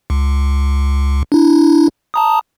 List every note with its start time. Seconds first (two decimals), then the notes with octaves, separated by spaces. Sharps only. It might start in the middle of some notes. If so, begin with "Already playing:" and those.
0.10 C#2
1.32 D4 E4
2.14 A5 A#5 D#6